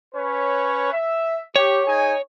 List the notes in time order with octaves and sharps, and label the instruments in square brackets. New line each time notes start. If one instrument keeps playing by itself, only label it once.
[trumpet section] C#4 B4 C#5
E5
[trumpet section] G4 [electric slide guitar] C#5
[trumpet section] D#4 G#4 G#5